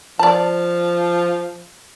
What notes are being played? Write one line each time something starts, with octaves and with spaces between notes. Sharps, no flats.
F3 D5 A5